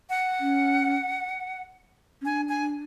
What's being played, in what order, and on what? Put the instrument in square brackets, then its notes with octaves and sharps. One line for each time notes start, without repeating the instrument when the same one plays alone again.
[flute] F#5
[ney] C#4
C#4
[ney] D4 [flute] G#5
[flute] G#5